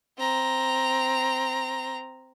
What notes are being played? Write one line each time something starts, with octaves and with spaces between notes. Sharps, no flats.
C4 A#5